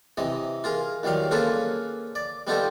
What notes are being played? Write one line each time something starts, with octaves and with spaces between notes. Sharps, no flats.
C3 E3 D#5
F4 G#4 A#4
E2 D#3 F#3 G3 F5
A#3 C#4 F4 G#4 A4 B4
D5
G3 B3 D#4 F4 G4 A4